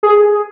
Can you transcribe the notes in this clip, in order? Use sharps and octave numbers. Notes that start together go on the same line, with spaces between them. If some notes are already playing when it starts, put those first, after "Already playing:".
G#4